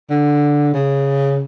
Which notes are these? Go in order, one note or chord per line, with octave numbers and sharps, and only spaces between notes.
D3
C#3